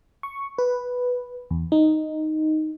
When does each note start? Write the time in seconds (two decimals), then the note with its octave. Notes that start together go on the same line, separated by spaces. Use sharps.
0.23 C#6
0.58 B4
1.51 E2
1.72 D#4